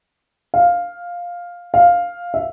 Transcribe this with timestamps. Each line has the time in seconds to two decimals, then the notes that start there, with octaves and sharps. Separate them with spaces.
0.54 F5
1.74 F5
2.34 E5